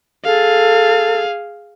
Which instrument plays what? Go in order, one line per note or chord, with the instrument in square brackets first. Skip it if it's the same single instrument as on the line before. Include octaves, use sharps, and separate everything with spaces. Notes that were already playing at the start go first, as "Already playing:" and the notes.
[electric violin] G#4 F5 [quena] A4